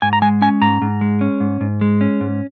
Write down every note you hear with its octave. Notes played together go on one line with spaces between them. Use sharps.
G#2 G#5
A#5
G#3 G#5
C#4 G#5
G#2 A#5
G#2
G#3
C#4
G#2
G#2
G#3
C#4
G#2